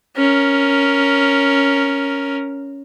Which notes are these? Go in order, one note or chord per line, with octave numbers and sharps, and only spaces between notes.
C#4 A#4